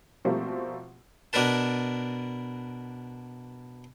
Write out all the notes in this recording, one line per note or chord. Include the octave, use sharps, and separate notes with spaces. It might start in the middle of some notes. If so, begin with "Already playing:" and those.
B2 F3 G3 A3 A#3 C4
B2 D4 A#4 B4 A5